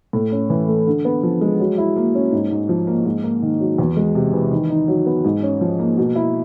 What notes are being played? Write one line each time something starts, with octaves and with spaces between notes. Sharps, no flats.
A2
C#4
E3
A3
D3
B3
F3
G#3
F#3
E4
A#3
C#4
G#2
G#2
F3
A#3
G#2
A#3
D#3
F#3
E2
G#3
C3
E3
D#3
D#4
F#3
B3
G#2
C#4
F3
A#3
B2
E4